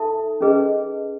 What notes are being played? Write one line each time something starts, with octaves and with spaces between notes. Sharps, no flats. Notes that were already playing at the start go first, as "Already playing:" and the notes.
Already playing: D#4 A4 E5 A5
C#4 G#4 B4 D#5